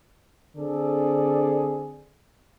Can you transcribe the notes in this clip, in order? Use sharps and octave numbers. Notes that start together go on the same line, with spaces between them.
D3 C4 G#4 A4 D5